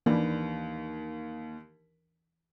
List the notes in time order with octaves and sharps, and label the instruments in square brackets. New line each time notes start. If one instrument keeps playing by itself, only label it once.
[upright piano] D#2 [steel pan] E3 D4 B4 [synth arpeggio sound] F3 A#3